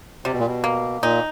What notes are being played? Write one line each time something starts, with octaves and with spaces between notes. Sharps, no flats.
C3 G3
B2
A#2
B2
A#3
A#2 D#4